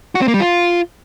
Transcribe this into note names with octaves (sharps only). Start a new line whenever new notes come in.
F#4
C4
A#3
G3
F4